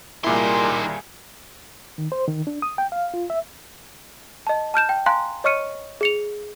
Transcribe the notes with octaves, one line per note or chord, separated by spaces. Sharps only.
C2 A#2 D#3 G3 E4 G#4 A#4 C6
D#3
C5
D#3
D4
D#6
G5
F5
F4
E5
D#5 A5
A5 F6 G6 E7
G5
F5 G#5 A#5 C6 F#6
C#5 D#5 C#6 F6 C#7 D#7
G#4 C#7 F7